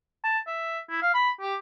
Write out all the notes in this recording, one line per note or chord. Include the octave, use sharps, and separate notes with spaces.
A5
E5
E4
F5
B5
G4